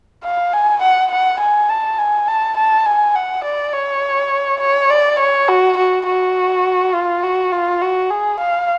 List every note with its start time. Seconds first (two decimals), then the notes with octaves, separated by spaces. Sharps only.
0.24 F5
0.54 G#5
0.82 F#5
1.12 F#5
1.40 G#5
1.70 A5
1.99 G#5
2.28 A5
2.57 A5
2.86 G#5
3.15 F#5
3.45 D5
3.74 C#5
4.61 C#5
4.90 D5
5.19 C#5
5.49 F#4
5.78 F#4
6.07 F#4
6.95 F4
7.23 F#4
7.53 F4
7.82 F#4
8.11 G#4
8.40 F5